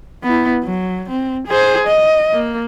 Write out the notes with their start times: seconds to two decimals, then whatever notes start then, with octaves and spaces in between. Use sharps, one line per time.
0.24 B3 E4
0.64 F#3
1.09 C4
1.47 G#4 C5
1.87 D#5
2.33 A#3